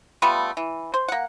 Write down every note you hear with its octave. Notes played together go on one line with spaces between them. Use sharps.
G3 A3 B3 F4
E3
C5
A#3 F#5